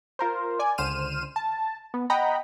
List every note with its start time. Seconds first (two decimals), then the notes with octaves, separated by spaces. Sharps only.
0.19 F4 A#4 C5
0.59 D5 G#5
0.78 C#2 D3 C5 F6 D#7 E7
1.36 A5
1.94 B3
2.10 D#5 F#5 G5 A#5 B5